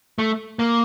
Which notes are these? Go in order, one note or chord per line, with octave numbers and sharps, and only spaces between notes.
A3
A#3